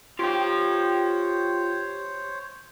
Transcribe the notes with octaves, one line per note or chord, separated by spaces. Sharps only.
F4 G4 C5 C#5 G5